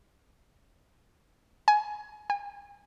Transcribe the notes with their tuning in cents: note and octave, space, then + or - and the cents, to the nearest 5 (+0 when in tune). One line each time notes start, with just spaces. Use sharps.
G#5 +20
G#5 -40